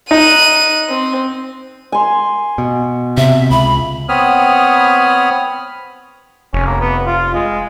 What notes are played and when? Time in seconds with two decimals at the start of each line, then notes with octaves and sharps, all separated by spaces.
0.11 D#4 F#6 D#7
0.89 C4
1.92 G#5 C6
2.58 B2
3.17 C3 E5
3.50 C#2 B5
4.09 B3 C4 C#5 B5 D#6 F6
6.53 F1 C#4
6.66 A#3
6.80 B3
7.07 F4
7.34 G#3